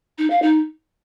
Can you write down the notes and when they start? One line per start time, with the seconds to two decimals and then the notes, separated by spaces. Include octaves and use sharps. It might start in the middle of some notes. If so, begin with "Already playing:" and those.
0.18 D#4
0.30 F5
0.42 D#4